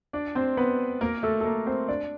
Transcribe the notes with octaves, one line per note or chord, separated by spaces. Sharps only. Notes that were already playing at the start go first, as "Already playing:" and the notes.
D4 D5
C4 C5
B3 B4
A#3 A#4
A3 A4
A4
A#3 A#4
C4 C5
D4 D5